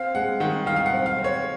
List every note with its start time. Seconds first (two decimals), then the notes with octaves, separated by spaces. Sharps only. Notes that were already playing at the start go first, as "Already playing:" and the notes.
Already playing: C4 F5
0.15 G#3 F#5
0.40 D#3 F#5
0.66 D#3 F5
0.76 F5
0.86 F#5
0.93 C4
1.06 F5
1.19 C4
1.24 C#5